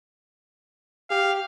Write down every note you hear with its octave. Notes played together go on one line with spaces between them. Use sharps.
G4 F5